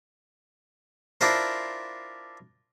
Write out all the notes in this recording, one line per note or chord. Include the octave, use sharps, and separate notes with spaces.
D4 E4 F4 A#4 C5